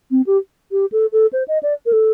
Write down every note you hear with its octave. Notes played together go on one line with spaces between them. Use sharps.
C4
G4
G4
A4
A4
C5
D#5
D5
A#4
A4